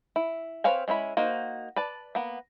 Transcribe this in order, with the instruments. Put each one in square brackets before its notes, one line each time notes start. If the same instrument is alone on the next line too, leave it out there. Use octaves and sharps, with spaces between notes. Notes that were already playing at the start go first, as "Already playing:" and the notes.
[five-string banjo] E4
C4 B4 C#5 F5 G#5
G#3 C#4 E4 B5
A#3 D#4 F#4 C5
B4 D5 A5
A#3 B3